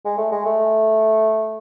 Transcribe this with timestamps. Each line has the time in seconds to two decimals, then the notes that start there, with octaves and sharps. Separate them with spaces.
0.05 G#3
0.18 A3
0.32 G#3
0.46 A3